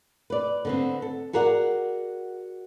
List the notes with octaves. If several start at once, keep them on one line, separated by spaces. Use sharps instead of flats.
B4 D5
D3 B3 C4
A4
F#4 G#4 A#4 D5 F5 F#5